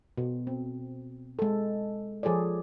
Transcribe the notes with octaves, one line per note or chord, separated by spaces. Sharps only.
B2
C4
G#3 A4
F3 G#4 A4 C#5 D5